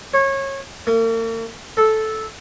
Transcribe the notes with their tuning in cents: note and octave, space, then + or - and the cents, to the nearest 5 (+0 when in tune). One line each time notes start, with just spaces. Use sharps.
C#5 -25
A#3 -45
A4 -10